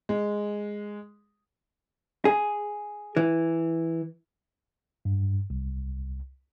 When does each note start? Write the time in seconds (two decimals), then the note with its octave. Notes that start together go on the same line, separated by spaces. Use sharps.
0.09 G#3
2.25 G#4
3.17 E3
5.05 G2
5.50 C2